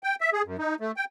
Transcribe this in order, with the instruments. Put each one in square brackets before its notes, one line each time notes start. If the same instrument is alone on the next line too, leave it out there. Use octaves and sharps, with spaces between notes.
[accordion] G5
E5
G#4
F#2
D#4
A3
G5